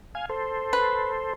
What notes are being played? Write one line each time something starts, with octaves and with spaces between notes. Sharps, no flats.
F5 G#5
A4 C5
B4